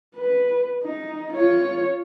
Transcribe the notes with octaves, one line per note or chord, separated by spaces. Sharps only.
B4
D#4
F4 C#5